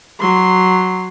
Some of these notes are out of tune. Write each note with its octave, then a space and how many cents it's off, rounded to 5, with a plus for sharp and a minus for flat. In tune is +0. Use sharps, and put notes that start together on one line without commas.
F#3 +0 C6 +0